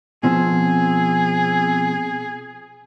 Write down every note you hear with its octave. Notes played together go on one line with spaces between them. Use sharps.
B2 F3 C4 G#4